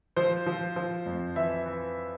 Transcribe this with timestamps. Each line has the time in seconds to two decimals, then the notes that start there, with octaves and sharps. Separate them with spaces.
0.16 F3 C5
0.47 F3
0.76 F3
1.06 F2
1.36 E3 E5
1.66 E3